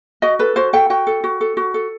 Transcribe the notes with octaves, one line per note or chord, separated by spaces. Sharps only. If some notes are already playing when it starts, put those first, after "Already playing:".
F#4 D#5
A4 B4
F#4 C5
A4 G5
F#4 G5
A4
F#4
A4
F#4
A4